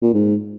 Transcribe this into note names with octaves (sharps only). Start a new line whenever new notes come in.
A#2
G#2